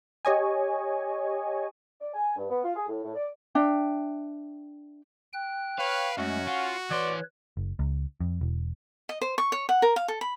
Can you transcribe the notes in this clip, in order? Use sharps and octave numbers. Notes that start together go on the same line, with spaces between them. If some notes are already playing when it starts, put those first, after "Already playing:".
G4 C#5 D#5 G#5
D5
G#5
G2
B3
F4
G#4
A2
A2
D5
D4 E5 G5
G5 F#6
B4 C#5 F5
F#2 G#3 A3 C#4 F#4
F4 F#5
E3 B4 C#5 D5 C6
F#1
C#2
F2
E1
D#5
C5
C#6
C#5
F#5
A#4
F5
A4
B5